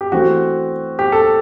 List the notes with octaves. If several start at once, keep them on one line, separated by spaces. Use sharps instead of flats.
G4
E3 A3 C4 F#4
G4
A4